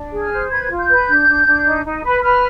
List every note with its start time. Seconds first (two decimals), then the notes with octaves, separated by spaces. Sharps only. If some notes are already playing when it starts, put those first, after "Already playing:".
Already playing: D4
0.12 G#4
0.22 F6
0.31 C5
0.50 B4 G#6
0.70 F4
0.79 G6
0.89 B4
1.08 D4
1.28 D4
1.46 D4
1.66 D#4
1.85 D#4
2.04 B4
2.23 B4 F6